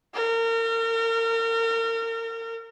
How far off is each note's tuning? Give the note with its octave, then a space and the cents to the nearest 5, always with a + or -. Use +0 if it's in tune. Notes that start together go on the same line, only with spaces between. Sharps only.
A#4 -35